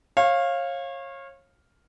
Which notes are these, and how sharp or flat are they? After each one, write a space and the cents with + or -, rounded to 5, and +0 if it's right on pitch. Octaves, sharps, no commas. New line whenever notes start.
C#5 -30 F5 +0